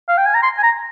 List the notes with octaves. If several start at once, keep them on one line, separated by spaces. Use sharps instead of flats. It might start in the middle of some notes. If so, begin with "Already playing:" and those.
F5
G5
G#5
A#5
C6
G#5
A#5